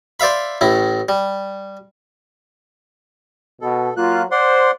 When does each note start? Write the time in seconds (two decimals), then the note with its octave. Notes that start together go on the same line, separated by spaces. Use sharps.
0.20 C5 D5 E5 F5 B5
0.61 A1 A2 E4
1.09 G3
3.61 B2 A4
3.97 F#3 A#3 F4 F#6
4.31 C5 D5 F#5 C6